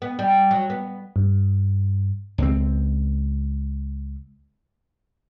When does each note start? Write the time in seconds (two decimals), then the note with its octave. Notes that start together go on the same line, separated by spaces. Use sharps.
0.02 B3
0.19 G3
0.51 F#3
0.70 B3
1.16 G2
2.38 C#2 C4